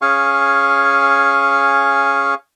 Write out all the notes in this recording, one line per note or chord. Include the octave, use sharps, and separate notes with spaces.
C#4 G#4 F5 G#5 C#6